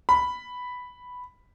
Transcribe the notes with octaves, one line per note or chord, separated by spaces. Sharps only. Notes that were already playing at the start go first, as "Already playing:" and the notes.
B5